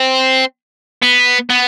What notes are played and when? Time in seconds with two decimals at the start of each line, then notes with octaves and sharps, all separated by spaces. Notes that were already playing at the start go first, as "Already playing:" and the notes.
Already playing: C4
1.02 B3
1.50 B3